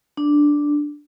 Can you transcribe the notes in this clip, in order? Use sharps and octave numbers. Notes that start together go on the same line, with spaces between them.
D4